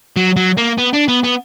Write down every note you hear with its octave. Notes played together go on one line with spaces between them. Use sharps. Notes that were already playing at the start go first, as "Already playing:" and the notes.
F#3
F#3
A#3
B3
D4
B3
B3